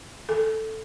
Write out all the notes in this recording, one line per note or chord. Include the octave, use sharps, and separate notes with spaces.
A4